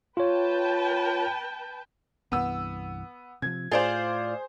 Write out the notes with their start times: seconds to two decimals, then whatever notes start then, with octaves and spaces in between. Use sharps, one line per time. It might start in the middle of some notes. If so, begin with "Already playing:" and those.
0.17 F4 B4 C#5 G5 A5
2.32 C2 G2 E3 B3 E6
3.42 C3 D#3 F3 G#6
3.72 A2 F4 G#4 C5 D5 F5